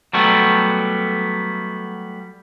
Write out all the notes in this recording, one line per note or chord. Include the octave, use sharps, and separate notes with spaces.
F#3 G3 A3 B3